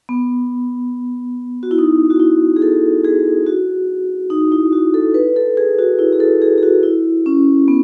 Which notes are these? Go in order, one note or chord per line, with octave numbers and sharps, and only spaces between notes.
B3
F#4
E4
D#4
F#4
E4
G#4
A4
G#4
F#4
D#4
E4
F#4
A4
B4
A4
G#4
F#4
E4
G#4
A4
G#4
G#4
F#4
E4
C#4
B3